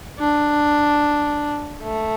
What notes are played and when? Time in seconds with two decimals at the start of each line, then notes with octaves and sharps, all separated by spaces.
0.19 D4
1.83 A3